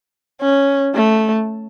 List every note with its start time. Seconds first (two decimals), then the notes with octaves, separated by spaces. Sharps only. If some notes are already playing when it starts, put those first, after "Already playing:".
0.41 C#4
0.95 A3